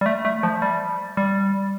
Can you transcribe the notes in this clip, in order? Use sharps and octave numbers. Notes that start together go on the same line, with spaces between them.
G3
A3
A3
F3
G3
G3